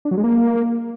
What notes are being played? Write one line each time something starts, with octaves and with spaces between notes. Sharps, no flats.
D4
F#3
G#3
A#3